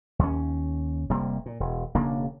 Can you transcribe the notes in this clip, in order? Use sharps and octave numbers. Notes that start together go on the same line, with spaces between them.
D#2 C#4
F1 C3 G3 A#3
A#2
E1
E1 C#3 A#3 D4